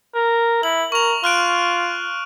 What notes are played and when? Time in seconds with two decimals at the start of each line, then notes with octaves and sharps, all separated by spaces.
0.14 A#4
0.63 E4 F#7
0.92 A#4 C#6 F7
1.24 F4 F6 F#6 D7